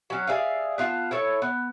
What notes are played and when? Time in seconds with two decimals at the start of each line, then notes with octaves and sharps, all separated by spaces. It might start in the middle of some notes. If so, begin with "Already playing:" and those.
0.10 F#3 C#4
0.27 G#4 D5 E5 F5
0.78 B3 F4 F5 A5
1.11 E4 A4 C#5
1.42 B3